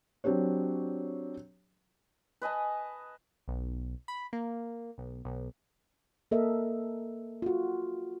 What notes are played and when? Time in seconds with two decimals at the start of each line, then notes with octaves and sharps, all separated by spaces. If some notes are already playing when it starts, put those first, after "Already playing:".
0.24 F#3 C4 D4 G4 C#5
2.42 B4 D#5 G#5 A5
3.48 B1
4.08 B5
4.33 A#3
4.98 B1
5.25 B1
6.31 A#3 A4 A#4 D#5 E5
7.42 F4 F#4